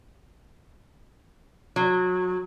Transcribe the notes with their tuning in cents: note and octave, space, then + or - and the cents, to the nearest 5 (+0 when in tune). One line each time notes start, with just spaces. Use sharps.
F#3 -25